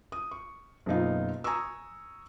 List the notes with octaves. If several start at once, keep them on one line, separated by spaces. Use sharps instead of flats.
D#6
C#6
F#1 B2 D#4 F4
G#5 A#5 C#6 D#6 E6